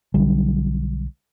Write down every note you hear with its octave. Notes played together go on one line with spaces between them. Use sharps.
B1 D3 F#3 G3